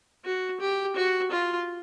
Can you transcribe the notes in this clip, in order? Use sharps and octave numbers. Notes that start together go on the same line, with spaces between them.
F#4
G4
F#4
F4